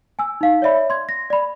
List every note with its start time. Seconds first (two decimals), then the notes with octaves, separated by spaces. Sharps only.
0.19 G#5 E6
0.41 D#4 F5
0.62 C#5 D5 E5 B5
0.90 C6 G#6
1.09 A#6
1.30 D5 B5